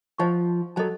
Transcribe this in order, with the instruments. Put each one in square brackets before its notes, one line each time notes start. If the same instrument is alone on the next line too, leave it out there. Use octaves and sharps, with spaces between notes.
[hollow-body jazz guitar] F3 [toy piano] C5 D#5 F#5 A5 C#6
[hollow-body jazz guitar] F#3 [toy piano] A4 D#5 A5